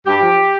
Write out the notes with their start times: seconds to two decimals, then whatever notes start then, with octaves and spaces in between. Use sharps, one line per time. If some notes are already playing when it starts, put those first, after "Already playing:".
0.06 G2 G4
0.22 F3